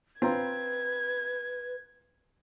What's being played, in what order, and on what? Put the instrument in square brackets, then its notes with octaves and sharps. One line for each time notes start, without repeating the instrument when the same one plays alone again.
[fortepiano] C4 F4 A#5 [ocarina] B4 [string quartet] G#6